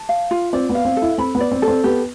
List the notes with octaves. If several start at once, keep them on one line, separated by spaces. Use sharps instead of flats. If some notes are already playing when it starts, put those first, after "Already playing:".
Already playing: A5
F5
F4
C4 D5
B3
F5
C4
A4
E4
C4 B5
B3
D5
C4
A4
C4
B3 G4